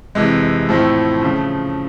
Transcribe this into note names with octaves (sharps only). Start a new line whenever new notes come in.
F2 C3 E3 G#3
A2 F3 A3 C4 E4
C#3 F3 A3